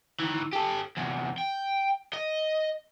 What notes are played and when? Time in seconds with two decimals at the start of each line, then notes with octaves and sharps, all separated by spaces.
0.20 D#3 E3
0.53 G4 A4
0.97 E2 C3
1.38 G5
2.14 D#5